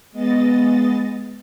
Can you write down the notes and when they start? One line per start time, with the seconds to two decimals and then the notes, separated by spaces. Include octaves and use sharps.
0.12 G#3 B3 D#5 A6